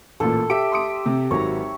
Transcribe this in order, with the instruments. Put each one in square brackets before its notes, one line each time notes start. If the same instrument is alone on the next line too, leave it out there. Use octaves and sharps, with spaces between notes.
[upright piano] A1 A#2 [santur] A4
[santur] G4 E5 [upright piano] D7
[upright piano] C6 D#6 D7
C3
[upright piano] G#1 F#3 [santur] C#5 A#5